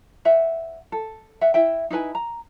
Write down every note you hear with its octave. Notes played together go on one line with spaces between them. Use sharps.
C5 E5 F#5
A4
E5 F#5
E4 E5 G5
D#4 E4 B4 G#5
A#5